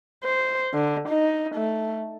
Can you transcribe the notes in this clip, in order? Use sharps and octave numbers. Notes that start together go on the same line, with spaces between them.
C5
D3
D#4
A3